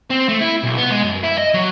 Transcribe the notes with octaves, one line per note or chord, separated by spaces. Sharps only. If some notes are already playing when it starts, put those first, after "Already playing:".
C4
A3
E4
B1
B3
G#3
F#2
E4
D#5
F#3